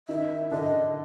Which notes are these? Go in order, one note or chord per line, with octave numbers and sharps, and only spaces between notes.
D#3 D#4 E5
D3 D4 D#5